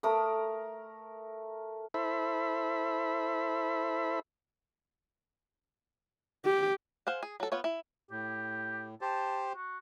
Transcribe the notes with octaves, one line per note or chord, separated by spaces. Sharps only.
A3 A#4 D#6
E4 A4 C5 E5 B5
G4
G#4 C5 F5 F#5
G#4
F#3 A4
B3 F4 C#5
E4
A2 G4
G4 C5 A5
F#4